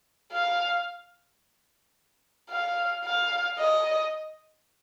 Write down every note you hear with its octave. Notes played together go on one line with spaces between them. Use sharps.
F5
F5
F5
D#5